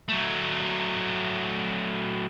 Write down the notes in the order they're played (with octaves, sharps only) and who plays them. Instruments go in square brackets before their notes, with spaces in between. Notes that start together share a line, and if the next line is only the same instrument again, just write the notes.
[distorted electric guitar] F#3 A3